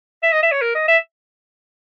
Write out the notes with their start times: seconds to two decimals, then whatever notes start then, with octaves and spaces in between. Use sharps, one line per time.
0.23 E5
0.32 D#5
0.43 E5
0.51 C#5
0.62 A#4
0.75 D#5
0.88 E5